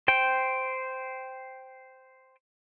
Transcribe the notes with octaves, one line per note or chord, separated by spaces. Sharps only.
C5 G5